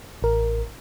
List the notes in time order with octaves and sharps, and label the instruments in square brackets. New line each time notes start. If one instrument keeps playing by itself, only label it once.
[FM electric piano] A1 A#4